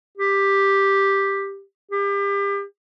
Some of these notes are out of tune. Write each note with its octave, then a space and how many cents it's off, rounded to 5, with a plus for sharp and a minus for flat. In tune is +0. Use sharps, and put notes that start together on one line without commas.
G4 +5
G4 +35